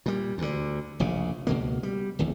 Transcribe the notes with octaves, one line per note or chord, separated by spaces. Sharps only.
A#2 G3
D2 D3
F1 A#1 C#3
C#2 B2 A#3
G3
D1 G#1 E2